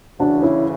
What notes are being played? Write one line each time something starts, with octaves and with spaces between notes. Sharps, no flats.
D2 C#3 E3 D4 F#4
C#4 E4